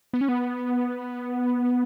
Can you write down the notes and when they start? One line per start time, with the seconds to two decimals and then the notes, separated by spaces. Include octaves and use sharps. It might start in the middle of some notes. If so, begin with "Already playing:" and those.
0.13 B3
0.21 C#4
0.28 B3